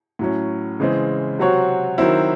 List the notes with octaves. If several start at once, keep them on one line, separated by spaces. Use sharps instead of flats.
A2 F#3 C#4
C#3 E3 G#3 C4
C3 F#3 C4 F#4 C#5
D#3 F#3 C4 E4